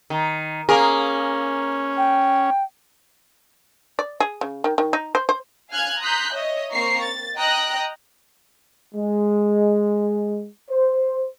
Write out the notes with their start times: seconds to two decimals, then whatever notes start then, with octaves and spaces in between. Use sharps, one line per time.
0.10 D#3
0.69 A#3 C#4 G#4 A#4
1.98 G5
3.99 D5
4.20 G#4
4.41 C#3
4.64 D#3
4.78 D#3
4.93 D#4
5.15 C5
5.29 C5
5.70 F5 G#5 F6 F#6 G#6
6.00 A#5 C6 D#6 F#6 G6 B6
6.33 C#5 D#5 E5
6.71 A#3 C4 A#5 C#6 C7
7.02 A6
7.37 D#5 G5 A#5 D#6 F#6 A#6
8.94 G#3
10.70 C5